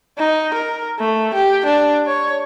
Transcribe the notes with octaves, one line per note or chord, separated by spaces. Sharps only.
D#4
A#4
A3
G4
D4
C#5